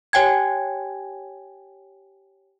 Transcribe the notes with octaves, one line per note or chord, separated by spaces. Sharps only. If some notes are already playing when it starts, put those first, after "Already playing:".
G4 C#5 G5 G#5 G#6